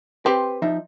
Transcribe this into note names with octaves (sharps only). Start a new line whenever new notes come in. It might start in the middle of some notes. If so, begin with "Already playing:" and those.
C4 G4 B4
F3 D#4 E5